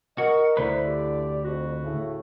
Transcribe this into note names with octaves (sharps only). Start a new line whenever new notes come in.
F#4 A#4 D#5
D2 D3 E4 B4 C5 D5
G4
F2 F#4
A2 C#3 A3